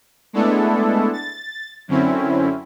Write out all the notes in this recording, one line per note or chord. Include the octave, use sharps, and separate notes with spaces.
G#3 A3 B3 D4 E4 A4
A6
F#2 D3 C4 C#4 E4